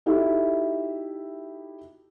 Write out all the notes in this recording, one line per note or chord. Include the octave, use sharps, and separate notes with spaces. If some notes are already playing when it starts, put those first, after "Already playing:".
D#4 E4 F#4 G4 A4 E5